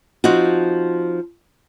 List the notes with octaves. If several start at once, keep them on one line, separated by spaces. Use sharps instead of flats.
F3 C4 D#4 F#4